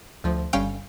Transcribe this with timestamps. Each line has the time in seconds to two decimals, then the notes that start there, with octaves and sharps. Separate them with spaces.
0.24 D2 F3
0.53 G1 G3 C#4 F5 G5